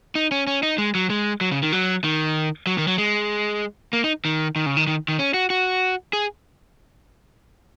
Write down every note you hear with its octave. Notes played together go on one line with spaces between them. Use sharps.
D#4
C#4
C#4
D#4
G#3
F#3
G#3
F#3
C#3
D#3
F#3
D#3
F#3
D#3
F#3
G#3
A#3
D#4
D#3
D#3
C#3
D#3
D#3
D#3
C#4
F#4
F#4
G#4